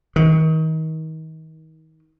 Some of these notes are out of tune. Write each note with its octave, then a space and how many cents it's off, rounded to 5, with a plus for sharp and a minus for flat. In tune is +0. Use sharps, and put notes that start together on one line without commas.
D#3 +35